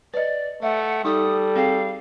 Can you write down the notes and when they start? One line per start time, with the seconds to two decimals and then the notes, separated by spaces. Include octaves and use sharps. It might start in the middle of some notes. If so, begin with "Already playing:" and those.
0.14 B4 D5 D#5
0.63 A3 E5 F#5
1.05 G3 D#4 A4 D#6
1.56 C4 G#4 F5 G5